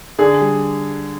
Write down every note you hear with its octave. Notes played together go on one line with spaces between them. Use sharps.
D3 G#4
G3